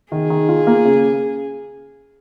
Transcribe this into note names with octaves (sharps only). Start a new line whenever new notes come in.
D#3 G#4
D#3
F4
A#3
C#3